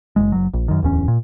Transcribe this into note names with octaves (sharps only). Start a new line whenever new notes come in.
F#1 C#2 G#3
F#1 F#3
A#1
F#2 D#3
D1 E2 C#4
A#2